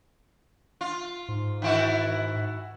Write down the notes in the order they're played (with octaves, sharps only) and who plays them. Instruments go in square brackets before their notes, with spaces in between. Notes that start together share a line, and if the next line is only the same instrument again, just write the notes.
[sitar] F4
[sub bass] G#2
[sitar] D#3 E4 F#4